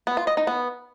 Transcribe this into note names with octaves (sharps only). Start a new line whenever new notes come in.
B3
F4
D#5
D#4
B3